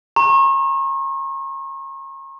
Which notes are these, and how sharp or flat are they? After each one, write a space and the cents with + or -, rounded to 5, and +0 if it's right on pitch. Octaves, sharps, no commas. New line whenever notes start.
A#5 +0 C#6 -40